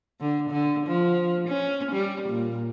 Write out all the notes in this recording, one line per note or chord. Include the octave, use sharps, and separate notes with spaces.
D3
D3
F3
C#4
G3
A#2